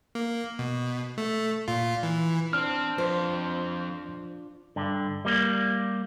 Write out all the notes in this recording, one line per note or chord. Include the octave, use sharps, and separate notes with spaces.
A#3
B2
A3
A#2 F4
E3
C4 D4 C5 F6
F2 F4 C5
G2 D3
G3 A#3